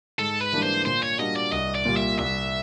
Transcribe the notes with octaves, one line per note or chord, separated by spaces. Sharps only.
G#2 A4
B4
E3 G3 A#3 D4
C5
A#2 C5
C#5
G3 A#3 D4 F#4 D#5
D5
C2 D#5
D5
A#2 G3
E5
C2 E5